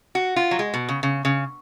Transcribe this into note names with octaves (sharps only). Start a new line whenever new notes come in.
F#4
F4
F#3
G#3
B2
C#3
C#3
C#3